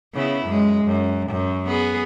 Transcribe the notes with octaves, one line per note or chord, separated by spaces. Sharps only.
C#3 B3 E4
F#2 G#3
F#2
F#2
B3 G#4